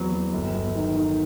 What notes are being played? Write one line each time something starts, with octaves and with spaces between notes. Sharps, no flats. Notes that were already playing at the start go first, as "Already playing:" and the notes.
Already playing: E2 F#3 B3 C4
F#3
G1
G1
D#3
D#3